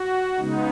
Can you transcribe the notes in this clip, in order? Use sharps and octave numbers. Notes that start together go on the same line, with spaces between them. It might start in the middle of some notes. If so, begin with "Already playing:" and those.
Already playing: F#4
C#3 G#3 B3 D#4